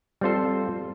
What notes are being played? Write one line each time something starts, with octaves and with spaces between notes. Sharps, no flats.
G3 C4 F4 A4 C5